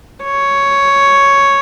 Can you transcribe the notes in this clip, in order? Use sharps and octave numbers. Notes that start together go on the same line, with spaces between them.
C#5